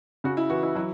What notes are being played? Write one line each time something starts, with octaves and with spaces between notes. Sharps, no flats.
C#3 F#4
E4
E3 F#4
E4
F#3 E4